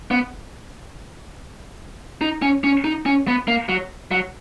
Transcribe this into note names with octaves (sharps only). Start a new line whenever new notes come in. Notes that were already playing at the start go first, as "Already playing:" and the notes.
B3
D#4
C#4
C#4
D#4
C#4
B3
A#3
F#3
F#3